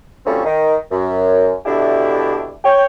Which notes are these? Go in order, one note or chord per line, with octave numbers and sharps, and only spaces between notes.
D2 F3 G3 A3 C4 C#4
D#3 D#4
F#2
B2 D3 D4 E4 G4 E5
C#5 G5